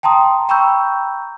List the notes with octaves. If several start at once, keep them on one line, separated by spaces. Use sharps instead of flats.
G5 A5 A#5 C6 D#6
G5 A#5 B5 C#6 E6 G6